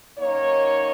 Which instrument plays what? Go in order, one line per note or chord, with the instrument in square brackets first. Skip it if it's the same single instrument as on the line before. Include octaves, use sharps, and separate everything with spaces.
[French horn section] F#2 D#3 A#3 D#4 C#5